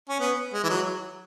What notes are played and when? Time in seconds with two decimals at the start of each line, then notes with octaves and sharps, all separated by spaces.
0.09 C#4
0.20 B3
0.53 G#3
0.64 E3
0.69 F#3